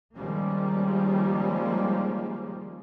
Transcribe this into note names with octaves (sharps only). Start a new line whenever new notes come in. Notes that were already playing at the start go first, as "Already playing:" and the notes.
D#3 F3 G3 G#3 A#3 C#4